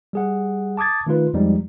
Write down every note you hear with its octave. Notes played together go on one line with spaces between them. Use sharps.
G3 G#4 F#5
A5 D6 D#6 G#6 A6
D#3 A3 D#4 F4 B4
F2 F3 G3 G#3 D#4